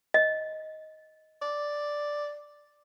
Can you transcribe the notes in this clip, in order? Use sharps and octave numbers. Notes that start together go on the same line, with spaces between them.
D#5
D5